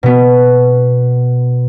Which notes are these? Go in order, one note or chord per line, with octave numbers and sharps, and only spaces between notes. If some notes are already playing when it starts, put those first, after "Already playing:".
B2 B3